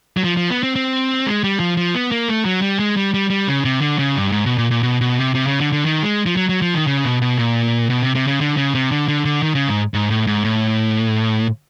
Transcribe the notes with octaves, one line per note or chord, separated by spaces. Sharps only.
F#3
F3
F3
B3
C4
C4
G#3
G3
F3
F3
B3
A#3
A3
F#3
G3
G#3
G3
G3
G3
C#3
C3
D3
C#3
G2
G#2
B2
A#2
A#2
B2
B2
C3
C3
C#3
D3
D3
D#3
G#3
F3
F#3
F#3
F3
D#3
C#3
B2
B2
A#2
B2
C3
C3
C#3
D3
C#3
C3
D3
D3
D3
D#3
C#3
G#2
G#2
A2
G#2
A2